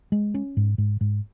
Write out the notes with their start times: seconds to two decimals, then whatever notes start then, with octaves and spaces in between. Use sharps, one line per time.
0.12 G#3
0.34 C#4
0.57 G#2
0.78 G#2
1.01 G#2